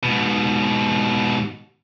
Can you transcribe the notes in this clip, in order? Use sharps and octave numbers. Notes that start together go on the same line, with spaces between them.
G#2 B2